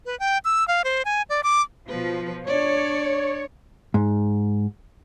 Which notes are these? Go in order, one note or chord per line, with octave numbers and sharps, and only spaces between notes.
B4
G5
E6
F5
C5
G#5
D5
D6
B2 F3 B4
D4 C#5 D5
G#2